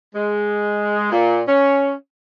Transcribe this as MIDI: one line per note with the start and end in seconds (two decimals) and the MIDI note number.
0.15 1.08 56
1.12 1.41 46
1.48 1.93 61